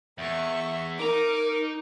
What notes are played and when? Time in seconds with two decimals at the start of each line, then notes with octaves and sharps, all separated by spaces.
0.18 E2 E5 C#6
0.99 D#4 A#4 A#5 D6